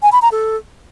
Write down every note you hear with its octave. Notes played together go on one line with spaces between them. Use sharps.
G#5
B5
A#5
A4